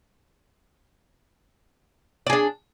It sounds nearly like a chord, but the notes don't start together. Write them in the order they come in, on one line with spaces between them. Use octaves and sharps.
D5 G#4 D4